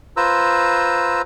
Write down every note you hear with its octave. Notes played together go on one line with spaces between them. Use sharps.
F4 B4 C5 A#5 E6